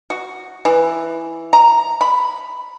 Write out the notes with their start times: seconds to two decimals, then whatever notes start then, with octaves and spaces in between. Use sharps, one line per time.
0.10 F#4
0.65 E3
1.53 A#5
2.01 B5